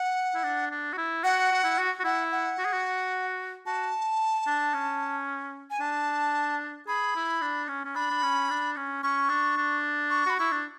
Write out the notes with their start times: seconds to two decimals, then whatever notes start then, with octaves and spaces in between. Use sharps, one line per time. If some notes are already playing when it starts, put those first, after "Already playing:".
Already playing: F#5
0.34 E4
0.43 D4
0.71 D4
0.93 F#4
0.97 E4
1.24 F#4 F#5
1.52 F#4
1.64 E4
1.78 F#4
1.99 F#4
2.04 E4 F#5
2.32 F#5
2.58 F#4
2.65 G#4
2.73 F#4
3.66 F#4 A5
4.47 D4
4.74 C#4
5.70 G#5
5.80 D4 A5
6.87 G#4 B5
7.15 E4
7.41 D4
7.68 C#4
7.85 C#4
7.95 D4 B5
8.10 D4
8.23 C#4
8.50 D4
8.77 C#4
9.03 C#4 C#6
9.29 D4
9.57 D4
10.10 C#6
10.26 F#4 B5
10.37 E4 C#6
10.51 D4